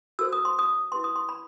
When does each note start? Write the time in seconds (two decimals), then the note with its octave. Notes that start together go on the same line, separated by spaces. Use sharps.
0.19 F#4 A4 C5 E6
0.33 D#6
0.45 C6
0.59 D#6
0.92 E4 G4 B4 C6
1.04 D#6
1.16 C6
1.29 B5